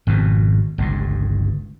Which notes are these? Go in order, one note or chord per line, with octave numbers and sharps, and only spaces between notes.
G#1 F2 B2
G1 C#2 G2